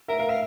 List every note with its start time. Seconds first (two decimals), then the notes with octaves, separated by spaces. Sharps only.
0.08 A#4 E5
0.19 A#4 F5
0.29 E5 F5